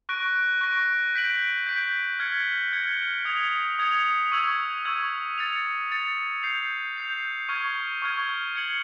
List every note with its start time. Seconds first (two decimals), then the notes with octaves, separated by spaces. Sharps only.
0.09 C#6 F#6 A#6 D7
0.61 C#6 F#6 A#6 D7
1.15 G6 B6 D7 F#7
1.67 G6 B6 D7 F#7
2.19 F6 G#6 C#7
2.73 F6 G#6 C#7
3.25 D#6 G#6 C#7 F7
3.79 D#6 G#6 C#7 F7
4.32 C#6 E6 G#6
4.85 C#6 E6 G#6
5.38 A6 C#7 F7
5.90 A6 C#7 F7
6.43 G6 C7 F7
6.97 G6 C7 F7
7.49 C#6 F6 G#6
8.02 C#6 F6 G#6
8.55 G#6 C#7 F#7